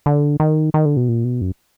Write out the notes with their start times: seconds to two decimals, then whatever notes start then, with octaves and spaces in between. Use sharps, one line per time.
0.06 D3
0.40 D#3
0.74 D#3
0.85 D3
0.97 B2
1.09 A#2
1.24 B2
1.41 F#2